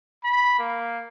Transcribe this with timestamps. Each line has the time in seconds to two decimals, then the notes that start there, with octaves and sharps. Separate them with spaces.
0.24 B5
0.59 A#3